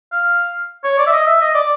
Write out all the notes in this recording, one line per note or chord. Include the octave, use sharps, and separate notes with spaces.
F5
C#5
D5
E5
D#5
E5
D#5
D5